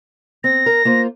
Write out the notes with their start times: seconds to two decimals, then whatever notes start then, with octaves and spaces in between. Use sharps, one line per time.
0.44 C4 A#6
0.66 A#4
0.85 A#3 F4 C5